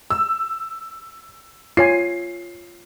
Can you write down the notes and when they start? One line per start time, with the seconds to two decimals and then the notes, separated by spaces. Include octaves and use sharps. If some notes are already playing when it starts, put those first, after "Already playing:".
0.10 E6
1.77 F4 C#5 G#5 C7